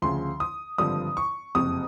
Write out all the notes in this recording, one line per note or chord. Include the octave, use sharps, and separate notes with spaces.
D2 C#3 F3 C6
D#6
G#1 G2 D3 F3 D#6
C#6
F#1 F2 C3 D#6